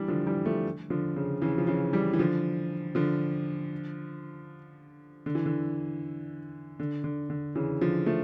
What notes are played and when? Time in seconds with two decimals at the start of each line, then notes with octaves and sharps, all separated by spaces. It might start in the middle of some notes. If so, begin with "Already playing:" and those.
Already playing: E3 G3 D4
0.08 D3 F3
0.27 E3 G3
0.46 F3 A3
0.90 D3 F3
1.16 C#3
1.42 C#3 E3
1.58 F3
1.67 C#3 E3
1.93 E3 G3
2.13 E3
2.19 D3 F3
2.95 D3 F3
5.26 D3
5.35 E3
5.46 D3
6.80 D3
7.04 D3
7.30 D3
7.55 C#3 E3
7.81 D3 F3
8.06 F3 A3